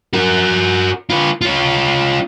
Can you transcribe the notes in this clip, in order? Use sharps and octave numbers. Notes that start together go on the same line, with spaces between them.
F#4 A#4
F4 B4
C#4 F4